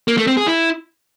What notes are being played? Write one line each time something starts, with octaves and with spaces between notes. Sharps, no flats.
A#3
A3
C4
G#4
E4